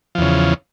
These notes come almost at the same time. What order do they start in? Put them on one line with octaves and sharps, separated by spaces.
F3 E2 C#3